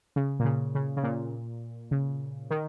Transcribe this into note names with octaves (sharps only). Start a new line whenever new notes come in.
C#3
A#2
C#3
C#3
C#3
A#2
C#3
D#3